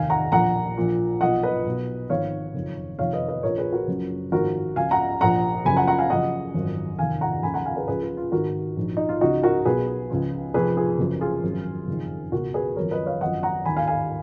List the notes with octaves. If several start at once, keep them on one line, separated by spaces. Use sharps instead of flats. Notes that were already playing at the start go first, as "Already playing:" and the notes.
Already playing: F1 D#2 D#3 F5 G#5
F#5 A#5
A#1 A#2 F3 F#5 A#5
A#1 A#2 F3
B1 A#2 F3 D#5 F#5
B4 D#5
B1 B2
G#1 G#2 F3 C#5 F5
F#1 F2 D#3
F1 F2 D#3 C#5 F5
B4 D#5
B4 D#5
A#1 A#2 F3 A#4 C#5
G#4 B4
F#4 A#4
F#1 F#2 C#3 F3
G#1 G#2 F3 F#4 A#4
C#2 C#3 F3 F5 G#5
F#5 A#5
A#1 A#2 F3 F#5 A#5
F#1 F#2 C#3 F3 G#5 B5
F#5 A#5
F#5 A#5
F5 G#5
F#1 F#2 C#3 F3 D#5 F#5
G#1 F#2 F3
F1 D#2 D#3 F5 G#5
F#5 A#5
D#2 C#3 F3 G#5 B5
F#5 A#5
F5 G#5
G#4 B4
C#2 C#3 F3 G#4 B4
F4 G#4
F4
G#1 G#2 D#3 F#4 A#4
A#1 G#2 F3
D#4
F4
C#2 C#3 F3 D#4 F#4
F#4 A#4
B1 B2 G#4 B4
C#2 C#3 F3
F1 F2 F3 G#4 B4
F4 G#4
F#1 F#2 F3
F4 G#4
G#1 F#2 F3
F#1 F2 D#3
C#2 B2 F#4 A#4
G#4 B4
G#1 F#2 F3 A#4 C#5
B4 D#5
C#5 F5
G#1 F#2 F3 D#5 F#5
F#5 A#5
D#2 D#3 G#5 B5
F5 G#5
F5 G#5